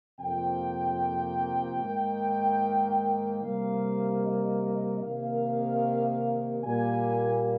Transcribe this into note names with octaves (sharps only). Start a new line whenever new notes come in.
F2 C3 F3 A#3 G5
G#2 D#3 A#3
C3 G3 A#3 F5
D#5
C3 D#3 A#3 F5
A#2 G3 A#3 G#5